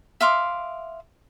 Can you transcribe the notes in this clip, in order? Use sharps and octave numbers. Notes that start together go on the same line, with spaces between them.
E5 F5 C6 D6